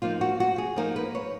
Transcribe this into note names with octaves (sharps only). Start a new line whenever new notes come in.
F3 A#3 D#4 F4
F#4
F#4
G#4
F3 A#3 D#4 A#4
B4
C#5